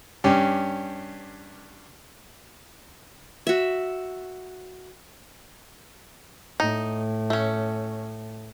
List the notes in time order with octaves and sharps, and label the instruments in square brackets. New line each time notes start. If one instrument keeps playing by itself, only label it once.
[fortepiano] G2 C#4 G4
[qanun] F#4 E5
[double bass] A2 [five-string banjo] D#4
[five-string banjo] A3 C#4